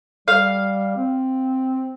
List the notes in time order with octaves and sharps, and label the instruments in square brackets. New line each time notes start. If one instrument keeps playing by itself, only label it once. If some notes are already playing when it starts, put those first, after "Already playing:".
[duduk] G3 [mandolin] F5
[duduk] C4